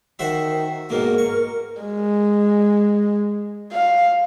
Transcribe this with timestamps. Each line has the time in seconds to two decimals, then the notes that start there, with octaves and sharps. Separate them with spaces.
0.19 D#3 F#4 C5 E5
0.90 G#2 B2 A#3 A#4
1.18 C#6
1.82 G#3
3.73 F5